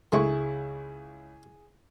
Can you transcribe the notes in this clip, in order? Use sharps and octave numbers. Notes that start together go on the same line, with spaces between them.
C#2 G#3 A3 C4 E4 G#4 C#6